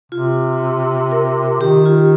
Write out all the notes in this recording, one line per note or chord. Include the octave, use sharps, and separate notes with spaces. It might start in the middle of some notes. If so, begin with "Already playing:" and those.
C3 F4
A#4
D#3 G4
F4